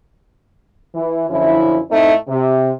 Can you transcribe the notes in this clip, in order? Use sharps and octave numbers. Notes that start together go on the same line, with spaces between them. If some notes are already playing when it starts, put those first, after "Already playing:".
E3
F#2 D3 F3 C#4 E4
A2 A3 C4 D#4
C3